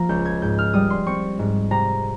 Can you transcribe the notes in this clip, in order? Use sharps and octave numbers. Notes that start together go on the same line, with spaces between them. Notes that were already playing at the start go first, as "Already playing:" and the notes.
Already playing: F3 A#3 A#5
C#2 G6
G#6
G#2 G6
F6
G3 D#6
C6
C4 C#6
G#2
C3 A#5